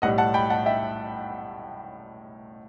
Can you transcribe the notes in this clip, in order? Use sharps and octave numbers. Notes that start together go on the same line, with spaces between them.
B1 A2 G3 D#5 F#5
F#5 A5
G5 B5
F#5 A5
E5 G5